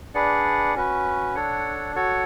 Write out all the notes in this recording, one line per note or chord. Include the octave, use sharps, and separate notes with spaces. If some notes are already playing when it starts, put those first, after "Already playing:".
D4 G#4 B4 D5 F#5
C#4 F#4 B4
D4 A4 C#5 F#5
F#4 A4 C#5 F#5